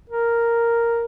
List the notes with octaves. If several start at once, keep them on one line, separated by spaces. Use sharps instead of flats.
A#4